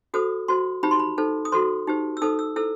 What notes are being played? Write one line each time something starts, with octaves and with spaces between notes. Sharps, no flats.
F#4 A4 C5 D#6
F#4 C5 C6
D#4 G4 C5 B5
C6
B5
D#4 A4 C5
D#6
F#4 A4 C5 C6
D#4 G4 C5
E6
D#4 A4 C5 D#6
E6
E4 A4 C5 E6